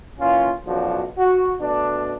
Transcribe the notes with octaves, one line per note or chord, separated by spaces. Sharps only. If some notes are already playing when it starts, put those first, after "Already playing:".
A#2 E3 C#4 F4
B1 C#3 F3 D4 F#4
F#4
B2 A3 D4